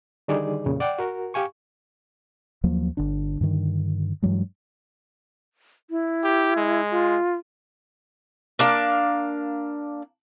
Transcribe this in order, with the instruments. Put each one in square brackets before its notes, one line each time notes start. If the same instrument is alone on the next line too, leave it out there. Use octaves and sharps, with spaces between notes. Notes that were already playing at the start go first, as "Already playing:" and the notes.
[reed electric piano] D3 D#3 G3 D#4 G#4 D5
F2 A#2 C#3
D5 F#5 G5
F#4 A#4
G4 F5 G#5 C#6
[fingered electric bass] D#2 F3 F#3 A#3
G1 D3 D4
G2 D3 D#3
G2 E3 F#3 G#3
[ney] E4
[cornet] G4
G#3
[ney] F4
[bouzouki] A#3 D4 F5